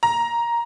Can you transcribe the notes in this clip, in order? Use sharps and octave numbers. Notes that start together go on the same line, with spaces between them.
A#5